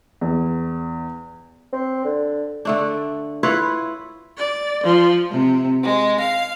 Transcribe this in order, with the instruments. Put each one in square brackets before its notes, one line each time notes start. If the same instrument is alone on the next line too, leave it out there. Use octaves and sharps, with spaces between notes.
[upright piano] E2
[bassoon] C4
D3
[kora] D3 A3 D4
E4 F4 B4 C#5
[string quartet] D5
F3
C3
G#3
F5